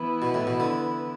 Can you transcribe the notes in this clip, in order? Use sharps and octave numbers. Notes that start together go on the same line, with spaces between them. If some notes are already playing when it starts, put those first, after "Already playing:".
Already playing: E3 B3 E4 B4
B2
A2
B2
D3